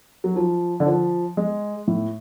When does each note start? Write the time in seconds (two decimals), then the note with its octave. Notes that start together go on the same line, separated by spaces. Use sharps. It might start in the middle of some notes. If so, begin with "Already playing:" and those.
0.24 F#3
0.36 F3
0.80 D3
0.87 F3
1.37 G#3
1.87 A2